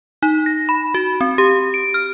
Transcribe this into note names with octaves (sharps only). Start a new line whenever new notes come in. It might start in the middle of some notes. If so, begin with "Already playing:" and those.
D#4
A#6
B5
F#4
C4
G4
D7
F6